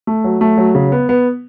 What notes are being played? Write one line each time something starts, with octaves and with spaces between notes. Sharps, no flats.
A3
F#3
A3
F#3
C#3
B3
B3